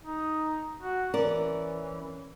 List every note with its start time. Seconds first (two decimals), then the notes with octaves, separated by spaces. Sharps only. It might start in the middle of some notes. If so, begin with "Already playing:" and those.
0.04 D#4
0.81 F#4
1.14 E3 C#4 A#4 D5